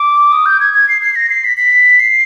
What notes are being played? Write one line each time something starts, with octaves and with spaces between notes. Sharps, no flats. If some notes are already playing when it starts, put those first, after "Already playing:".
Already playing: D6
D#6
G6
G#6
G#6
C7
C7
A#6
C7
B6
B6
C7